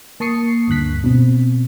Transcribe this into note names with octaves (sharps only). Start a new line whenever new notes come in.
A#3 A5 C#6 D#6 C7 C#7
D2 G2 D3 F#6 B6
B2 C4